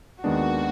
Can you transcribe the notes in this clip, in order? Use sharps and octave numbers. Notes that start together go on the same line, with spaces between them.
D#2 D#3 G#3 B3 D4 F#4